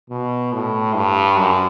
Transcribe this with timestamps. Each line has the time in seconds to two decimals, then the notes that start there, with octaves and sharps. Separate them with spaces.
0.10 B2
0.53 A2
0.95 G2
1.38 F#2